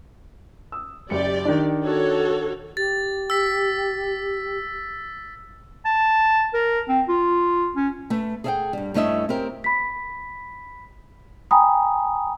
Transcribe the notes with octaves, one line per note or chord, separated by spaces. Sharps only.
D#6 E6
F#1 G4 D5 C#7
D#3 D4
F#4 A4 C#5
G4 A6
E6 B6
A5
A#4
C4
F4
C#4
A3 A4 B4
G#4 A4 D5 E5 F#5 G5
G2 G3
G2 A3 C#4 E4 D#5 E5
C4 C#4 G4 A#4
B5 B6
G5 G#5 A#5 B5 D#6